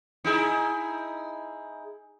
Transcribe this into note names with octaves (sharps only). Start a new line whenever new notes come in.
D#4 E4 G#4